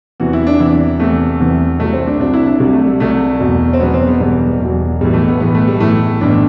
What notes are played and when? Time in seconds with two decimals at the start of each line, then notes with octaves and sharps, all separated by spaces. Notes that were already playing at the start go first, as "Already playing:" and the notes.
0.20 E2 C3 E3 F#4
0.33 E4
0.47 D4
0.60 E2 C3 E3 E4
1.00 E2 C3 E3 A3
1.40 E2 C3 E3
1.80 C2 C3 F#3 A3
1.93 C4
2.07 D4
2.20 C2 C3 F#3 D4
2.33 E4
2.47 D4
2.60 C2 C3 F#3 G3
2.73 A3
2.87 G3
3.00 C2 C3 F#3 A3
3.40 E1 E2 B2 F#3
3.73 C4
3.80 E1 E2 B2 F#3 B3
3.94 C4
4.07 B3
4.20 E1 E2 B2 F#3 G3
4.60 E1 E2 B2 F#3
5.01 B1 A2 E3 G3
5.13 A3
5.28 B3
5.40 B1 A2 E3 B3
5.54 A3
5.67 G3
5.80 B1 A2 E3 A3
6.21 B1 A2 E3 D4